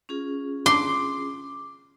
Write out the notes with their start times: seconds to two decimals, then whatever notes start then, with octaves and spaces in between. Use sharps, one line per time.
0.09 C#4 F4 G#4
0.66 C6 D6